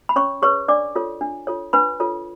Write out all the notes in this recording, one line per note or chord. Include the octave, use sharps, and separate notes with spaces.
B5
C#4 C#5 C#6
G#4 B4 C#5 C#6
D4 D5 D6
F4 A4 C#5
D4
F4 A4 C#5
D4 B4 B5
F4 A4 C#5